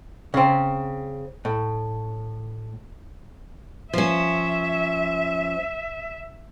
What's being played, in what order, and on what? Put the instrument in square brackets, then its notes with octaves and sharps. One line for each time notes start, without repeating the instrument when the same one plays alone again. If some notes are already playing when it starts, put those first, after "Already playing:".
[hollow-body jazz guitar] C#3 C4
A2
[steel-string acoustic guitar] F3 C#4 [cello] E5